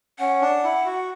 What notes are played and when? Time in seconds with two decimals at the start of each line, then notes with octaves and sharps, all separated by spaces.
0.19 C#4 F#5
0.42 D4
0.64 E4
0.86 F#4